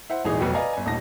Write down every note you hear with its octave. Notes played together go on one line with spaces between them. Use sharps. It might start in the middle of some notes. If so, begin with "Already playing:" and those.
E4 C5 F#5
D#1 G#1 E3 D#4 G#4
F1 B1 F#4 B4 G5
B4 D5 D#5 F5 G#5 A#5
G1 G#5
D#1 A1 G3 D#4 A5 A#6